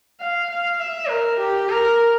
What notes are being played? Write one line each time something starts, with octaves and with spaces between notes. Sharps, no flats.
F5
F5
E5
A#4
G4
A#4